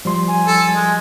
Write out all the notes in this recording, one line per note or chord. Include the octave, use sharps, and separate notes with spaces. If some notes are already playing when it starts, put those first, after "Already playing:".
F3 G3 C6
G#5
A4
G#3